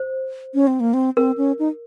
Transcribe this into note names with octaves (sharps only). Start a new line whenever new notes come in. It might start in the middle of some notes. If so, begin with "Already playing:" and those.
Already playing: C5
C#4
C4
A#3
C4
C4 A#4
C#4
D#4